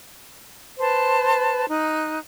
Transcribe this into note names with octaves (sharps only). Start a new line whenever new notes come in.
B4 C5 A5
D#4 F#6